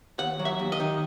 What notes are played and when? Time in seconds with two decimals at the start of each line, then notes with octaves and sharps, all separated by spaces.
0.19 D#2 F#5
0.39 F#3
0.45 E5
0.59 D#2
0.72 D#5
0.80 D#3